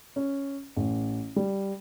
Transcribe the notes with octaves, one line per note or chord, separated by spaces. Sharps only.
C#4
A1
G3